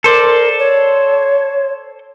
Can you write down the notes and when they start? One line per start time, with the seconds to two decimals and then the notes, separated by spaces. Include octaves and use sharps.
0.04 A4 A#4 C5 D5
0.59 C#5